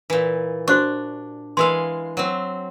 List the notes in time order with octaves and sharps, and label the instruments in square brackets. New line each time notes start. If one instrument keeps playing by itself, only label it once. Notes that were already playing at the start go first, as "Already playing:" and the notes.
[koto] A#2 E3
[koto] D4 [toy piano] F#4 C5 C#6
[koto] E3 G#3 F5 [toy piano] A#4 C6
[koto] F#3 C4